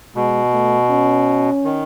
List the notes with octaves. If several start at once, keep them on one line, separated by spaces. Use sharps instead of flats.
B2 G#3
A3
C#4
D#3